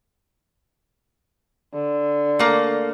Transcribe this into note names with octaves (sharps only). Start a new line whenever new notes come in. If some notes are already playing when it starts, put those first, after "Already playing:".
D3
A3 A#3